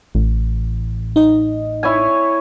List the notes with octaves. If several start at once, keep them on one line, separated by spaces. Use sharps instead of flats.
A1
D#4 D#5
E4 C#5 G#5